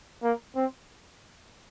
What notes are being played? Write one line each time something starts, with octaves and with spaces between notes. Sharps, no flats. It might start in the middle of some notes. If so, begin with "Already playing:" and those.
A#3
C4